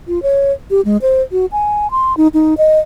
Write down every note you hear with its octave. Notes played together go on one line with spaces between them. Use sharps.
F4
C#5
G4
G#3
C5
F#4
G#5
C6
D#4
D#4
D#5